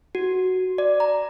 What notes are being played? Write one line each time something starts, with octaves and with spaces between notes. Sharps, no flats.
F#4
D5
A#5